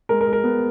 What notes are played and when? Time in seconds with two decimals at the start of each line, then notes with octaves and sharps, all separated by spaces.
0.09 G#3 A#4
0.21 A#4
0.27 G#3
0.33 A#4
0.44 B3